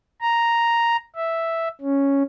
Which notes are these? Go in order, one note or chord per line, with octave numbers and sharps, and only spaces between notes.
A#5
E5
C#4